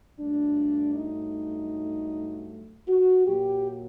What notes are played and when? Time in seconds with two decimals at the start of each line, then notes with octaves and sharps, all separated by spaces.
0.19 G2 F#3 A3 D4
0.95 D#4
2.88 F#4
3.26 A#2 F#3 A#3 G4